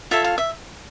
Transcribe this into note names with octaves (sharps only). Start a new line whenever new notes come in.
F4 A4 C#5 E5
F5
E5